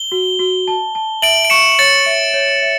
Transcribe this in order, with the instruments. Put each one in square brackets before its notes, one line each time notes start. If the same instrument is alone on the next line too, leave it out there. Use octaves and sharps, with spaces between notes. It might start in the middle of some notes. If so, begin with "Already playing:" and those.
Already playing: [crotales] G7
[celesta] F#4
F#4
A5
A5
[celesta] E5 [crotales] D7 F#7
[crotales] D7
[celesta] C#6 [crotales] C#7 E7
[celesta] C#5 [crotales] A6 C#7
[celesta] E5
C#5
E5